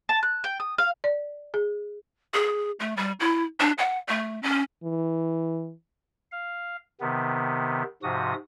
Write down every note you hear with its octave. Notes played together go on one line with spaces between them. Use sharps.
A5
F#6
G5
D#6
F5
D5
G#4
G#4
A3
G3
E4
D4
F#5
A3
C#4
E3
F5
C3 D#3 B3
G#2 C3 F3 F#4 D#6